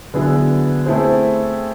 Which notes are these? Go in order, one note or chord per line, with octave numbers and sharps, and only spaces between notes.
D3 F#3 B3 E4 G#4
A3 C4 E4 G#4 C5